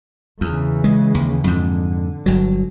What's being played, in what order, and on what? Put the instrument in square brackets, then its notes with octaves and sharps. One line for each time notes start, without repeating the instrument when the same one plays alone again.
[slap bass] E2 [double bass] C#3 E3
[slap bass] G#3
D#2
[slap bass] F2 G#2 [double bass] D3
[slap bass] G1 F#3